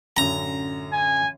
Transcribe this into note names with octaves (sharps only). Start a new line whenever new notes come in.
A1 F#2 D3 A#5
G#5